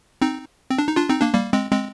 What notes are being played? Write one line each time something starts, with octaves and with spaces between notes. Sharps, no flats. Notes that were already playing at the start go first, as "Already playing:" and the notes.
C4 D#4
C4
D4
D#4
D4 F4
C4 D#4
A#3 D4
G3 A#3
G#3 C4
G#3 C4